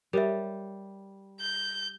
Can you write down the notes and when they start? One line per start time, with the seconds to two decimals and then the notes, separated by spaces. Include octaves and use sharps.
0.13 G3 A#4 C#5 E5
1.40 G6